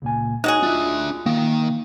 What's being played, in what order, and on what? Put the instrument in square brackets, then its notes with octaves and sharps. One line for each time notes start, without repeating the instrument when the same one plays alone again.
[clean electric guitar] C#2 A#2 G#5
[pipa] G#3 F#4 G#4 [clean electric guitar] D#4 C#5 [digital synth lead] F#6
[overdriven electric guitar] D4 E5 [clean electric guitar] F4
[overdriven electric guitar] D#3 [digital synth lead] A#3